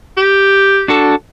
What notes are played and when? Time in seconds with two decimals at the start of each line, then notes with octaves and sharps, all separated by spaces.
0.17 G4
0.88 D4 F#4 A4